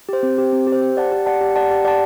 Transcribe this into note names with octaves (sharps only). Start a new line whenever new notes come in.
G4 C5
C4
G4 C5
C4
G4
C5
G4
D5 F#5 A5
G4
D5 F#5 A5
G4
D5 F#5 A5
G4
D5 F#5 A5